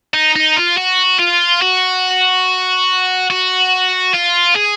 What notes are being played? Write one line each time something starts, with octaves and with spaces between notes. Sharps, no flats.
D#4
D#4
F4
F#4
F4
F#4
F#4
F4
G#4